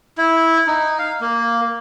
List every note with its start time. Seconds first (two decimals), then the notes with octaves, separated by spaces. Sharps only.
0.18 E4
0.67 D#4
0.99 F5
1.21 A#3